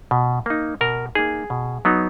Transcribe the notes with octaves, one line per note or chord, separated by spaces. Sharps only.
B2
A#3 D#4
B2 A#4
A#3 D#4 G#4
B2
F#3 B3 D#4